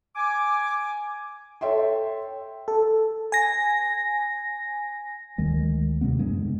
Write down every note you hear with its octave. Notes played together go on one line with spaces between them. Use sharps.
G#5 D6
A4 C#5 E5 G5 C6
A4
G#5 A#6
D2 D#3 G#3
D#2 C3 G#3 B3
F#2 C#3 G#3 D4